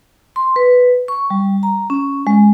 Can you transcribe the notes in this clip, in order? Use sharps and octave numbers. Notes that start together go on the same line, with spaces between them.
C6
B4
C#6
G3
A#5
C#4
G#3